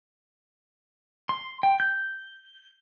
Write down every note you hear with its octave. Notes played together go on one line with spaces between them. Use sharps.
C6
G5
G6